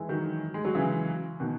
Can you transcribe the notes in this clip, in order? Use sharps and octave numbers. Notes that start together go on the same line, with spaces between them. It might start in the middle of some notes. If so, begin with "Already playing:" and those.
Already playing: E3 G#3
D#3 F#3
G#3
F#3
C#3 E3
B2 D#3